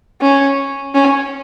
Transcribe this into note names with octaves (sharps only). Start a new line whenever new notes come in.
C#4
C#4